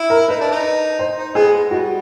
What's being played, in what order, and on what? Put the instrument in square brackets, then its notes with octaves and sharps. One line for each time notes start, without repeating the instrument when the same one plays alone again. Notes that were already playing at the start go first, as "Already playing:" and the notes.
Already playing: [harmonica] E4
[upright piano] A#4
[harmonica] D#4 [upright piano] B4
[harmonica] D4
D#4
[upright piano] C5
[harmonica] D#4
[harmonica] B3 [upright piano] G#4
[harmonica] G#3
[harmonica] G3 [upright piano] F#4